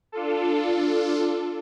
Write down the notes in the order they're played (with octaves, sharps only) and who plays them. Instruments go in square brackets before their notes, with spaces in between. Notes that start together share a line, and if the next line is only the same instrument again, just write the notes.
[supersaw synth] D4 F4 A4